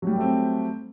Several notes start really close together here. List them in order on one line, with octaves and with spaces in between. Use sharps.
F#3 G3 G4 A3 C4